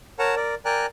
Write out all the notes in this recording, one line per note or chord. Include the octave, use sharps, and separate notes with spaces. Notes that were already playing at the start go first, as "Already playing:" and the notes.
A#4 C#5 F#5 A5 A#5
A#4 D5
A#4 D5 G5 G#5 A#5 F#6